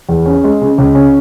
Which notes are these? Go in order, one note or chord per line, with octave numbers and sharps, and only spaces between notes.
E2
C#4
G#3
C#3
C#2
C#4